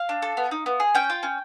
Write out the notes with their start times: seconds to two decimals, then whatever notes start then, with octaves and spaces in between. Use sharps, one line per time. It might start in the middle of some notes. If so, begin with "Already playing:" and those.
Already playing: F5
0.09 D4
0.22 A4
0.37 B3
0.51 D#4
0.66 B3
0.80 G#4
0.95 C#4 G5
1.10 F4
1.23 C#4